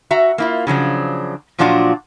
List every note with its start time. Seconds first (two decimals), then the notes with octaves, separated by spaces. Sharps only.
0.11 F#4 E5 A#5
0.38 A#3 E4 F4
0.67 C#3 F3 F#3 D4
1.59 A#2 F3 F#3 D4 F4 F#4